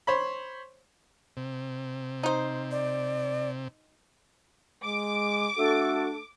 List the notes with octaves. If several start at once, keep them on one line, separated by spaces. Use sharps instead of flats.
C5 C#5 B5
C3
D#4 C5
D5
G#3 D6
A3 D4 F#4 A4